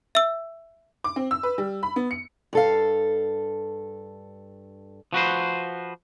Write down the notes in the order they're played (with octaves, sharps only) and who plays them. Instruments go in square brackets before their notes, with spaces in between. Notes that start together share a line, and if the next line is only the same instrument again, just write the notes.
[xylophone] E5 E6
[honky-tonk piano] D6
C4
E6
B4
G3
B5
B3
C#7
[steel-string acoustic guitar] G2 A4 F5
[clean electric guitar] F3 F#4 B4 C5